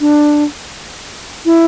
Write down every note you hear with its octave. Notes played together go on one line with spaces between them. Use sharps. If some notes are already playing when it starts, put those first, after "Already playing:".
D4
E4